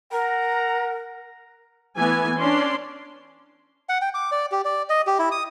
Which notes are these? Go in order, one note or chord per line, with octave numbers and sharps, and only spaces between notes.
A#4 F#5 A#5
E3 A3 B3 G#5
C#4 D4 D5 C6
F#5
G5
D6
D5
G4
D5
D#5
G4
E4
D#6